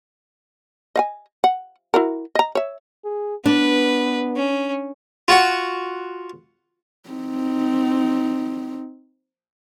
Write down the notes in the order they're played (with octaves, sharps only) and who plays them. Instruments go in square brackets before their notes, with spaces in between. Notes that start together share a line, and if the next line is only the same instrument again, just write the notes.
[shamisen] D#5 F5 G#5
F#5
E4 F#4 A#4
D#5 A#5
C#5 E5
[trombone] G#4
[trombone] B3 [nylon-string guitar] D4 [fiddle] B4
[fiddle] C#4
[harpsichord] F4 F#4 F#5
[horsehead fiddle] C4 D#4